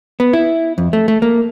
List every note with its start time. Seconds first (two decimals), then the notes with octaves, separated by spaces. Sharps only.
0.20 B3
0.33 E4
0.78 F2
0.93 A3
1.08 A3
1.22 A#3